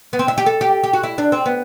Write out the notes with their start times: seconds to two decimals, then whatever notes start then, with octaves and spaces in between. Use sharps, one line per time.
0.13 B3
0.19 C4
0.28 E4
0.38 G4
0.46 A4
0.61 G4
0.83 G4
0.93 F#4
1.03 E4
1.18 D4
1.32 C4
1.46 B3